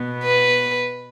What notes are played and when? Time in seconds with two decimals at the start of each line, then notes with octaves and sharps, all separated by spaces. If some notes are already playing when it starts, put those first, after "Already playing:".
Already playing: B2 B3
0.23 B4